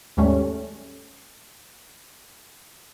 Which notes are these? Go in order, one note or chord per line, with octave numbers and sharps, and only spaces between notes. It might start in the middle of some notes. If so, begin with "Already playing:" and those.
D#2 G#2 G3 A3 C#4